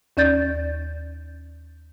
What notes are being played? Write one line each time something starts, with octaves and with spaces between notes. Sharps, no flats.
D#2 C#4 D5 G6 A6